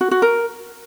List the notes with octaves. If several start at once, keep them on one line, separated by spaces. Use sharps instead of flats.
F#4
F#4
A#4